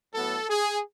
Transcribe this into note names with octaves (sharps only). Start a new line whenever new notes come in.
A2 F#3 B3 A4
G#4